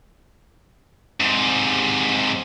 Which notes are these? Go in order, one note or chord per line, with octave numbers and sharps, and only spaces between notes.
G#2 C3